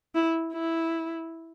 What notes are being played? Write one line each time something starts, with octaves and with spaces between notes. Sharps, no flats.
E4
E4